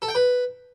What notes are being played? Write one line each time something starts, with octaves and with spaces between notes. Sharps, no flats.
A4
G5
B4